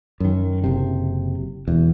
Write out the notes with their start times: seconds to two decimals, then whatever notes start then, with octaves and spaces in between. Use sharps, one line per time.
0.20 F#2 D#3
0.64 F#1 C3
1.67 E1 E2